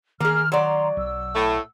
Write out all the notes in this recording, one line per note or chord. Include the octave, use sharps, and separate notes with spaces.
D#3 A#3 G#4 F6
F#3 D5 A#5 C6
B1 E6
A2 A3